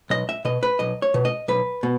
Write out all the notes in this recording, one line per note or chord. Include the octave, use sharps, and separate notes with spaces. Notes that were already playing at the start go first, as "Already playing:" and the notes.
B1 D#5
E5
B2 D#5
B4
B1 D#5
C#5
B2
D#5
B1 B4
B2